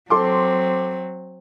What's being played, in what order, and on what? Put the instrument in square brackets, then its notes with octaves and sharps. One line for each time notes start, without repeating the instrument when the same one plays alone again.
[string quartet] F#3 C4 [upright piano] A4 C6 D6